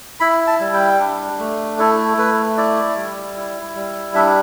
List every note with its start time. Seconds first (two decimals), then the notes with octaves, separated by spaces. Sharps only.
0.20 E4 B5
0.47 A5
0.60 G3
0.74 G5
1.00 D4
1.39 A3
1.79 E4 A4
2.17 A3 B4
2.57 E4 D5
2.96 G3
3.36 E4
3.75 G3
4.15 D4 E5